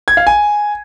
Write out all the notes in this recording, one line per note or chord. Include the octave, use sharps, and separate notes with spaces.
G#6
F5
G#5